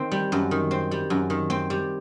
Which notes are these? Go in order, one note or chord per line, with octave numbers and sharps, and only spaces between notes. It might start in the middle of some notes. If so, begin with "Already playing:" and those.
Already playing: D#3 C4
G3
F#2
D#3
C4
G3
F#2
D#3
C4
G3